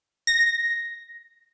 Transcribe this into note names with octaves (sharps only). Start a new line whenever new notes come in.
A#6